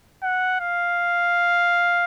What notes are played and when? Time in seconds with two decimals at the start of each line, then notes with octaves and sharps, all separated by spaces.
0.23 F#5
0.60 F5